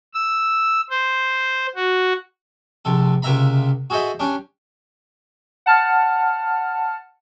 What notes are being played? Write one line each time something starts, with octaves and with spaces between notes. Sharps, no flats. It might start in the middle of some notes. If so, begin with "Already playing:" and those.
E6
C5
F#4
A#1 C3 A4
C#2 C3 A#3 E5 A#5 B5
F#4 G#4 A4 C5 D#5 E5
G3 C#4 D4
F#5 A5 F6